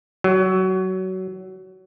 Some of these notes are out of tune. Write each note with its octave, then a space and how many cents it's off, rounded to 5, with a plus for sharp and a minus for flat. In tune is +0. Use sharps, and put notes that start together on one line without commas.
F#3 +20